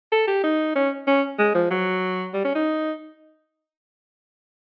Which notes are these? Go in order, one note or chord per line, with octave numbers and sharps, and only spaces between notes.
A4
G4
D#4
C#4
C#4
G#3
F3
F#3
G3
C#4
D#4